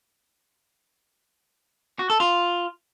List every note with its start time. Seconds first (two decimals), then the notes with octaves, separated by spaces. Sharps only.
1.99 F#4
2.10 A4
2.20 F4